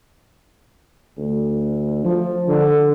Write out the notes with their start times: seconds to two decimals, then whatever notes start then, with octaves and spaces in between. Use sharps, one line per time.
1.18 D2
2.04 F3
2.48 D3